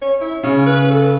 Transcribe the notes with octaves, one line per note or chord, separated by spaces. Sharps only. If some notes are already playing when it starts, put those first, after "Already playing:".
C#5
E4
C#3 C#4
B4
A4